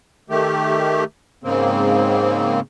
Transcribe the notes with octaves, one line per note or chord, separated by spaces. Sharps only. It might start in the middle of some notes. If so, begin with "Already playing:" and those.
D#3 A3 G4
G#2 C#3 A#3 C4